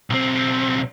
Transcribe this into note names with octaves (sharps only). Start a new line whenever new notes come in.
B1 C4